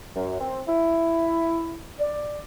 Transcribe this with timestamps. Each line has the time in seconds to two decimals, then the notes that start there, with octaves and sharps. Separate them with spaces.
0.16 F#2
0.40 C4
0.68 E4
1.99 D5